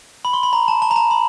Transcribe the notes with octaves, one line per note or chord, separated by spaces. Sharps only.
B5
C6
B5
A#5
A5
A5
A#5
A5
B5